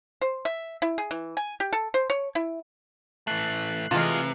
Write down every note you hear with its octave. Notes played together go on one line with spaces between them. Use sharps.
C5
E5
E4
G#4
E3
G#5
G4
A4
C5
C#5
E4
E3 A3 F#6 C7 F#7
C3 E3 G#3 A3 F4 A5